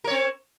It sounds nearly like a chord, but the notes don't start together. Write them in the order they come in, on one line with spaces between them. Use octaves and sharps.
A#4 C#5 C4